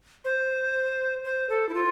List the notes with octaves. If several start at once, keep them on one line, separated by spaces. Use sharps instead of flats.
C5
C5
A4
E4
F4